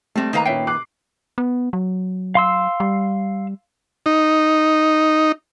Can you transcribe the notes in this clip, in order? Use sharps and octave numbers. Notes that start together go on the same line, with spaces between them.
G3 A3 C4
D#3 A#3 B4 C5 F5 A#5
A#2 C#4 E5 G5 C7
D6 F#6 C7
B3
F#3
F5 C6 E6
G3
D#4